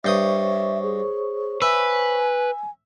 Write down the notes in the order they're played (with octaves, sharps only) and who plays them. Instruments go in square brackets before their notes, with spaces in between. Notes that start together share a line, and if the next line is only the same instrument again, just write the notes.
[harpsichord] G2 G5 D#6 [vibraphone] C5 C#5 C#6 [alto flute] E5
[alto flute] G#4
[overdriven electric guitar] B4 [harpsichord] E5 [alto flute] G#5